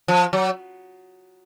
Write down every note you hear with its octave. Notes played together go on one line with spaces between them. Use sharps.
F3
F#3